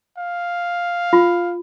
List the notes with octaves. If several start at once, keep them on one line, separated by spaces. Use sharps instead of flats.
F5
F4